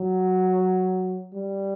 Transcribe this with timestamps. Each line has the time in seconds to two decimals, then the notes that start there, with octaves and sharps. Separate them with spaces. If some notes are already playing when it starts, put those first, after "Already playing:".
Already playing: F#3
1.34 G3